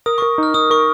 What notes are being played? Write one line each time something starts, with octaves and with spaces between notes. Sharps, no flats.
A#4 D#6
C#6
A#4
D#4 F6
D#4 D#6
A#4 C#6